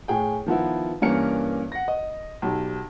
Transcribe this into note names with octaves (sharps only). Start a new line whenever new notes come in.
A2 G#4 G5
D#3 F3 B3 E4
G2 E3 A#3 C#4 A#4 C#7
F#5 A#6
D#5
B1 G4